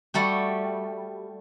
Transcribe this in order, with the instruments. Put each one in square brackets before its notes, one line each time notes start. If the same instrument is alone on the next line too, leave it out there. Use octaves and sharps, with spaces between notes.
[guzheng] G3 A3 F#4 G4